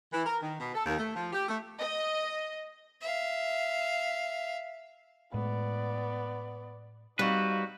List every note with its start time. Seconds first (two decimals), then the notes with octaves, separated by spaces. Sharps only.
0.13 E3
0.26 A#4
0.42 D#3
0.60 B2
0.75 A4
0.86 D#2
0.98 A3
1.14 F3
1.33 G4
1.48 A3
1.80 D#5
3.01 E5 F5
5.34 A2 G#3 B3 D5
7.19 G3 C4 D#4 F#4 B4 F5